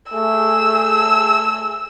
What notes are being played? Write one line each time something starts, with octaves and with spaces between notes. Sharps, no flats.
A3 G#4 E6